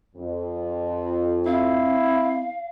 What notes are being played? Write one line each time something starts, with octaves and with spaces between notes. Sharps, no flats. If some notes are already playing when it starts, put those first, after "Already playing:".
F2
C4 E4 F5